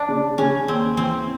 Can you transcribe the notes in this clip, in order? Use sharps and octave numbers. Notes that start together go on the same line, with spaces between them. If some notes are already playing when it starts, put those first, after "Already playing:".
Already playing: D4
C#3
C#3 C#4
D#2 C4
E3 C4